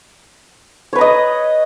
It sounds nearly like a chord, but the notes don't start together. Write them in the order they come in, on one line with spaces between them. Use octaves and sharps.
C#5 B4 A#5 D#5